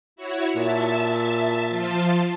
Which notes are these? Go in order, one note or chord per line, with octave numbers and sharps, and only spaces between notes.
E4 F#4 C#5
A#2 E5 A5
F3 F4 A5